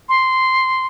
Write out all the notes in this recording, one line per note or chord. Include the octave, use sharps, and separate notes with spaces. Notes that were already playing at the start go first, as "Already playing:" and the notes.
C6